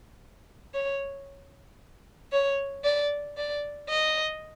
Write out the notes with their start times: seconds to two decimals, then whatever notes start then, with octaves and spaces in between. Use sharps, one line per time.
0.74 C#5
2.32 C#5
2.84 D5
3.37 D5
3.89 D#5